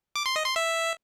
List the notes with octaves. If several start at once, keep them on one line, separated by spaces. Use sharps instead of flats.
D6
C6
D#5
C6
E5